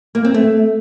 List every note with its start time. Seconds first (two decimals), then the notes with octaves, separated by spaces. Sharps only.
0.15 A#3
0.25 C4
0.34 A3